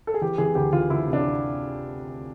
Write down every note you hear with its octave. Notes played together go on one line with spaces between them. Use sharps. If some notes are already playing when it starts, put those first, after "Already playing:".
A4
G#4
E3 G4
E3 G#4
D2 G4
E3 F4
D2 E4
C3
D4